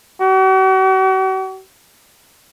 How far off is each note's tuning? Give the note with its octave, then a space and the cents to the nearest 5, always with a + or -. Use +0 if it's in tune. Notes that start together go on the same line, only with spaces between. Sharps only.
F#4 +45